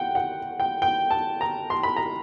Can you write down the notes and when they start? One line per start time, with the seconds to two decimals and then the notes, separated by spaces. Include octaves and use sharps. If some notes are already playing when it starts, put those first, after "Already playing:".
Already playing: F#5 G5
0.15 F#5
0.60 G5
0.82 G5
1.11 A5
1.41 A#5
1.70 C6
1.83 B5
1.96 A#5